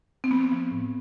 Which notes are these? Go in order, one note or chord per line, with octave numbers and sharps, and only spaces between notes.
C4
F3 B3
F3
A2